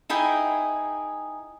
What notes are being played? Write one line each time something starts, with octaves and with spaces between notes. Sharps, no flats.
D#4 E4 G#4 G5